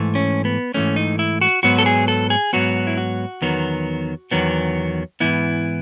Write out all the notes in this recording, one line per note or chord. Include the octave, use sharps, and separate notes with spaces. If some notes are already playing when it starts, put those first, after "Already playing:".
Already playing: G#2 E3 A3
C#4
B3
G#2 E3 A3 C#4
D#4
E4
F#4
G#2 F#3 B3 F#4
A4
G#4
A4
G#4
G#2 F#3 B3 F#4
E4
F#4
E2 D#3 F#3 B3
E2 D#3 F#3 B3
G#2 E3 B3 E4